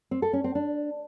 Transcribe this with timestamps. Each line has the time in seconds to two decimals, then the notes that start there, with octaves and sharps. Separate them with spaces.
0.11 C4
0.22 A4
0.33 C#4
0.44 C4
0.55 D4